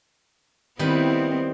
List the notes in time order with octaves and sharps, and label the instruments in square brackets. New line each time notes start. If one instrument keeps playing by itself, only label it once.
[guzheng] D#3 G3 B4 [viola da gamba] B3 C4 E4